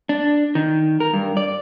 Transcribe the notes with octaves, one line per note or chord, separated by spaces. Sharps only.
D4
D#3
A#4
G2
D5